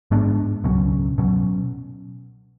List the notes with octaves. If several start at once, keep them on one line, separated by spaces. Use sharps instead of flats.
G#2 G#3 B3 D4
C#2 B2 F#3 C#4
B2 F#3 C#4